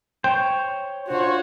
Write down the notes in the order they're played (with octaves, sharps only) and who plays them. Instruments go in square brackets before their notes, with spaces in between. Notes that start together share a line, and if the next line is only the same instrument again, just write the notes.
[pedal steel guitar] C5 C#5 [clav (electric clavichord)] G5
[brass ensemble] D4 F4 F#4 [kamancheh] C5 C#5